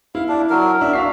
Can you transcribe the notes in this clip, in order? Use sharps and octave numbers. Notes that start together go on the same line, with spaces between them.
E4 F5
D4
F#3 A#4
D4 E5
F#4 F5 B6 C7